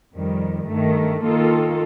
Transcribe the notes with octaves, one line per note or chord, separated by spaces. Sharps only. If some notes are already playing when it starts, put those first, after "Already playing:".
F2 D#3 G3
G2 D#3 A3
D#3 A#3 F4 A4